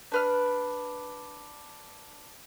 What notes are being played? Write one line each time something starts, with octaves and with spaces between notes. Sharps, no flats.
D4 B4 F6